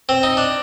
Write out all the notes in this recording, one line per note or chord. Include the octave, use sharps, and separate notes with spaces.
C4
D#4
D4